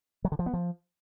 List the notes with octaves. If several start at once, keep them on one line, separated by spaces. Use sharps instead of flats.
F#3
D3
F3
B3
F3